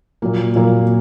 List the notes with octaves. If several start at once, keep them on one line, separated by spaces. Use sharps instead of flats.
A#2 F#3 A#3
A#2 F#3 A#3